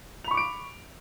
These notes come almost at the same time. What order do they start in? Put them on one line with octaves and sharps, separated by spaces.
F7 B5 C#6 D6 D7